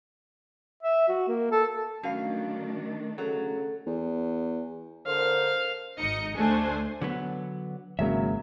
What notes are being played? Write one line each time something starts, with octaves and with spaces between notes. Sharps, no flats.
E5
F#4
A#3
A4
F#2 D#3 G3 A3 D4 F5
C#3 F#3 A4
E2
D3 A4 A#4 C5 F5
G#1 D#4 D#5 C#7
D2 A3 D4 C5 G#5
D3 F#3 B3
G#1 C#3 F#3 G#3 A#3 E5